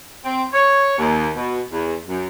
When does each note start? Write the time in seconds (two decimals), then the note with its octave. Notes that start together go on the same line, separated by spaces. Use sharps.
0.24 C4
0.53 C#5
0.97 D#2
1.35 B2
1.72 E2
2.08 F#2